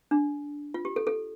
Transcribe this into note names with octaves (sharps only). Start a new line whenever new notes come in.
D4
F4
G4
A4
A4